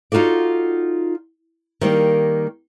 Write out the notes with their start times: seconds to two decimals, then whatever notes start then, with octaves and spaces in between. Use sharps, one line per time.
0.12 D#4 F4 F#4 A4 D5
1.81 D#3 G3 A#3